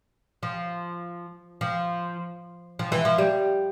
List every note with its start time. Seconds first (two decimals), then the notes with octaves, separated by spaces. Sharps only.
0.43 F3
1.61 F3
2.79 F3
2.92 E3
3.05 F3
3.18 G3